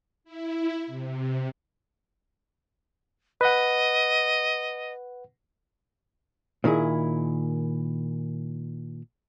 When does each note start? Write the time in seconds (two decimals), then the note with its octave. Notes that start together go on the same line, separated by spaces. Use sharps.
0.24 E4
0.87 C3
3.41 B4 D#5 F#5
6.64 A#2 D#3 E4 G#4